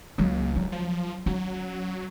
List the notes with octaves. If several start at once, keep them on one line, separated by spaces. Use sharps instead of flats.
C#2 F#3 A#3
D1 F#3
F3
F#3 C#4